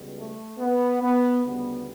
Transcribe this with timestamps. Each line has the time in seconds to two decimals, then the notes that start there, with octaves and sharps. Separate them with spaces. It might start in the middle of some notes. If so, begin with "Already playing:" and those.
Already playing: C#2 B2 G3
0.16 A3
0.59 B3
1.02 B3
1.45 D2 C#3 G3 B3